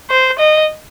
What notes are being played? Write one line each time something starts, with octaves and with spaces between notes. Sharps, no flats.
C5
D#5